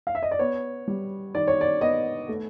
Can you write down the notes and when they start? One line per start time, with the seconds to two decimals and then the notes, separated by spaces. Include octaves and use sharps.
0.07 F5
0.15 E5
0.23 D#5
0.31 D5
0.39 B3 C#5
0.88 G3
1.35 D#3 D5
1.48 C#5
1.61 D5
1.81 B3 D#5
2.29 A3